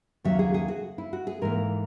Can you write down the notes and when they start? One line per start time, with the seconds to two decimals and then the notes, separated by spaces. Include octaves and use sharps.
0.24 D#2 C#3 F#3 A#3 E5
0.39 G#4
0.54 G#4
0.68 F#4
0.98 E4
1.13 F#4
1.27 G#4
1.41 G#2 E3 A#3 A#4